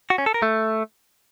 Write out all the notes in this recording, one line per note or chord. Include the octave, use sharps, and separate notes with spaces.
F#4
C#4
A4
A#4
A3